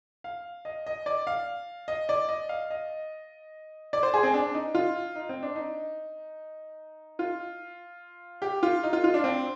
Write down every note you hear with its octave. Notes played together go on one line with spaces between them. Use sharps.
F5
D#5
D#5
D5
F5
D#5
D5
D#5
F5
D#5
D5
C5
G#4
C4
D4
D#4
F4
D#4
C4
D4
D#4
F4
G4
F4
D#4
F4
F4
D4
C4